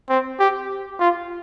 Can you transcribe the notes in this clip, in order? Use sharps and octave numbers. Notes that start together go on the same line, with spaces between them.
C4
G4
F4